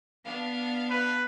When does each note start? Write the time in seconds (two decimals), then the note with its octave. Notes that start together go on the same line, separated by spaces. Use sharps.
0.24 B3 D4 F5
0.90 B4